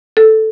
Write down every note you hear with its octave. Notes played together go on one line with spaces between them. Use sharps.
A4